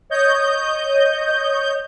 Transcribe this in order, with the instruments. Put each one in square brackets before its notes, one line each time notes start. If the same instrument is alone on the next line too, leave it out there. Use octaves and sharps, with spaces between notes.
[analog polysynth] C#5 D#5 G6